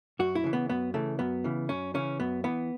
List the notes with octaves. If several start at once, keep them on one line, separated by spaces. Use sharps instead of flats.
F#2 F#4
E4
C#3 E3
B3
F#2 B3
C#3 E3 A3
F#2 B3
C#3 E3
F#2 C#4
C#3 E3 C#4
F#2 B3
E3 B3